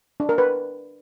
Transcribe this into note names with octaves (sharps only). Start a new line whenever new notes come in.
D4
A#4
B4